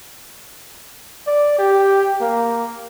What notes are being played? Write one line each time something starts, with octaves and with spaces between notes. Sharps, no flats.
D5
G4
A#3